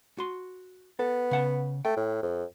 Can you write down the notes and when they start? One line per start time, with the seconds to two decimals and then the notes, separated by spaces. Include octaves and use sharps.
0.18 F#4 C6
0.99 B3 A4
1.31 C#3 F#5 A5
1.85 A3 G5
1.97 A2
2.23 F2